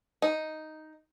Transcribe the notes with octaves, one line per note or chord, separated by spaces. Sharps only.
D#4